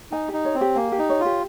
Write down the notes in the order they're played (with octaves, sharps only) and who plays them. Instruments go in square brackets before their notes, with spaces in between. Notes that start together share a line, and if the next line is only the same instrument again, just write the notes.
[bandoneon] D#4 [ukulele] G#5
[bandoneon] D#4 [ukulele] G4
[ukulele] C#5
[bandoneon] C4
[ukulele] G4
[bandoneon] A#3 [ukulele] G#5
[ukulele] G4
[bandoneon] D#4
[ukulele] C#5
[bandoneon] F4
[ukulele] G4